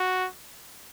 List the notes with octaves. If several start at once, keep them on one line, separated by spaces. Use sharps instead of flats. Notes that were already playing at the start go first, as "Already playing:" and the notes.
Already playing: F#4